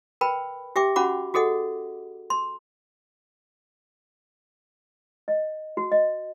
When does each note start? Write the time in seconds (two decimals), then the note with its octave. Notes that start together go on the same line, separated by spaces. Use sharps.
0.21 A#4 B4 G5 B5
0.76 G4 E5 G5 D6
0.96 C#4 F#4 F#5 B5 D6
1.34 F#4 G#4 A4 D#5 F#5
2.30 C6
5.28 D#5
5.77 F#4
5.92 D#5